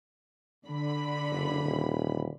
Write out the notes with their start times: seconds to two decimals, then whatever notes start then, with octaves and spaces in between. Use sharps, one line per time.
0.66 D3 B5
1.31 F#1
1.65 D#1